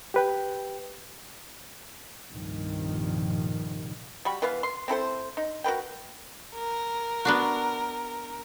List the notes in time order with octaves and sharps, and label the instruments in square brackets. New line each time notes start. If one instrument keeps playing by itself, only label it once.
[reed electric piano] G4 B4 G5
[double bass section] C2 G2 A#2 D#3 F3
[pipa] G3 F#4 B5
E3 B3 B4 F5
C6
C4 E4 A4 C5
D#4
F#4 A#4 B4 G5
[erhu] A#4
[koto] B3 D4 F#4